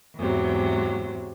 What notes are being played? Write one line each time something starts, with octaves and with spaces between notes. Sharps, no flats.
E2 G#2 C3 F#3